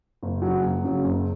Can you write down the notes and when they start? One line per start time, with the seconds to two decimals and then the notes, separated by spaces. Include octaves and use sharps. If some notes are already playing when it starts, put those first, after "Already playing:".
0.23 F#1
0.42 F#2 C#3 F#3
0.63 F#1
0.83 F#2 C#3 F#3
1.04 F#1